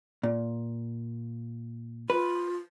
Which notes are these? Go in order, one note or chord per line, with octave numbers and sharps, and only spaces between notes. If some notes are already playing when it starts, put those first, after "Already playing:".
A#2
F4 B4